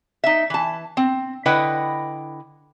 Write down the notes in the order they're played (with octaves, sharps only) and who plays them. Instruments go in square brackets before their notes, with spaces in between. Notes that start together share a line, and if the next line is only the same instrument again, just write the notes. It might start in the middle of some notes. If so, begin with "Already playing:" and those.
[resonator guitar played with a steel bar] D#4 E5
E3 A5
C4
D3 E4 B4 D#5 F#5 G5